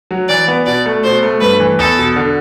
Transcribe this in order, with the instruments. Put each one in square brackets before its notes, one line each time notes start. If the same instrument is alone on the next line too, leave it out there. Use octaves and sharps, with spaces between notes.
[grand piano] F#3
[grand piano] E3 [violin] D5
[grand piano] B3
[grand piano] B2 [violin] D5
[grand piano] A3
[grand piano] B2 [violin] C5
[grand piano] A3
[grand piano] G2 [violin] B4
[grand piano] E3
[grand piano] E2 [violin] A4
[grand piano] B2
D3